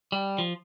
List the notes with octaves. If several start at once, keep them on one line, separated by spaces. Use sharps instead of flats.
G3
F3